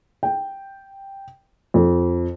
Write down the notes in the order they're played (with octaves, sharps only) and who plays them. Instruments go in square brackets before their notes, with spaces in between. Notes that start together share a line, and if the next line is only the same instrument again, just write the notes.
[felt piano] G5
F2